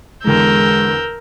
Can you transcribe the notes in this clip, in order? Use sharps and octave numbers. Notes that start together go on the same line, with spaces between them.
E2 D3 E3 G#3 A#4 E6 G6